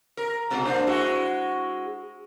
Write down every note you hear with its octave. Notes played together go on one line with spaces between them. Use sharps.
A#4
G#2 B2 F#4
A#3 D4 C5
G#3 E4 F#4